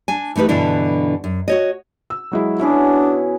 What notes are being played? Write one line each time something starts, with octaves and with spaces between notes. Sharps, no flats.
D4 G#5
E3 A3 D#4 G4 B4
G2 B2 D3 E3 D4 E4
F#2
F#4 C#5 D#5
E6
F#3 G#3 E4
B2 C#4 D4 E4 G#4